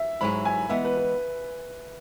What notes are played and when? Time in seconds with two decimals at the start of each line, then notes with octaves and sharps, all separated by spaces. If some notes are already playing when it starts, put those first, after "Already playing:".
Already playing: E5
0.21 G#2 F#3 E4 G#4 B5
0.45 G#5
0.69 E3 G#3 B3 E5
0.85 B4
0.97 B4